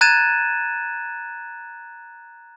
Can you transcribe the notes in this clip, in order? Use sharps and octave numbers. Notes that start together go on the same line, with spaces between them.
A#5 F#6 G#6 A6 D#7 E7